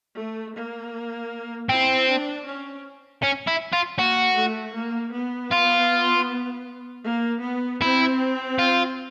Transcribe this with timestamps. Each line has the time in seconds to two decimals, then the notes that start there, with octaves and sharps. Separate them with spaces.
0.16 A3
0.55 A#3
1.69 C4 E4
2.07 D4
2.46 C#4
3.23 C#4
3.47 E4
3.73 F4
3.98 A#3 F#4
4.37 A3
4.75 A#3
5.13 B3
5.52 F4
7.05 A#3
7.43 B3
7.81 C4 E4
8.59 F4